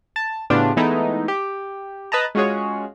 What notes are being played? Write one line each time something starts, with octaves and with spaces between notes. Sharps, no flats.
A5
A2 C#3 B3 D4 F4 G4
E3 G#3 A3 B3 D#4 E4
G4
B4 D#5 A5 A#5
G#3 C#4 F4 F#4 G#4 C#5